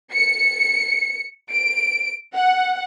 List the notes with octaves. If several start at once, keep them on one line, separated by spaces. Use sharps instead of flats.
C#7
D7
F#5